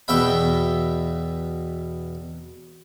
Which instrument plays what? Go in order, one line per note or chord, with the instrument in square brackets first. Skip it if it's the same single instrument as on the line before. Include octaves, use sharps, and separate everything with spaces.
[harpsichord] E2 B2 E5 G5 B5